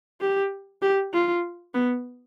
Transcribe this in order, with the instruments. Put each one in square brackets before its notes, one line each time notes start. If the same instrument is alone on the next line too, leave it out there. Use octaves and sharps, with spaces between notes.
[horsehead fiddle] G4
G4
F4
B3